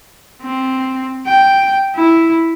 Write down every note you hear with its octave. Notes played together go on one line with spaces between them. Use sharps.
C4
G5
E4